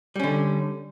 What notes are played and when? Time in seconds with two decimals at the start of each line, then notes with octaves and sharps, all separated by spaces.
0.16 G3
0.20 C#4
0.24 D3